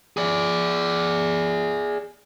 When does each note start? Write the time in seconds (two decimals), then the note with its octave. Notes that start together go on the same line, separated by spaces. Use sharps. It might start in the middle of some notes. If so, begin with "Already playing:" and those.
0.17 G#4 D5